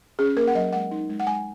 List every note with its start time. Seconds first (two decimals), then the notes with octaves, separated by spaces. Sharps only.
0.19 C#4 G#4
0.37 A#3 A#4
0.48 F#5
0.55 F#3 D#5
0.73 G#3 F#5
0.91 D#4
1.09 G#3
1.20 F#5
1.27 G#3 G#5